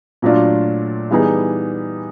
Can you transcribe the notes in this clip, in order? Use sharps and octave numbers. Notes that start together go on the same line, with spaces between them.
A#2 F#3 A3 D4 F4
E3 G3 B3 D#4 G#4